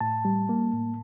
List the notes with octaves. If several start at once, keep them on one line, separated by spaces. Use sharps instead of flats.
A2 A5
G3
A#3
A2